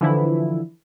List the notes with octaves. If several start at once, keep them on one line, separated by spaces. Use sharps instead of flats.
D3 E3 F3 E4